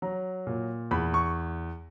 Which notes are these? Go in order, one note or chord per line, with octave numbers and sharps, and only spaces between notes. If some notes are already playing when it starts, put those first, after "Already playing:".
F#3 A#5
A#2
E2 B5
C#6